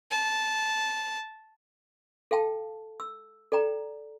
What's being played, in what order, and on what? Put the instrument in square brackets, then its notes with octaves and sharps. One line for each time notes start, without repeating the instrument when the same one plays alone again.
[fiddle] A5
[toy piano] A4 F5 G5 A5
E6
A4 D5 G5 A#5